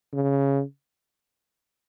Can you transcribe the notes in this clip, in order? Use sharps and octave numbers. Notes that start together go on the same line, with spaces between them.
C#3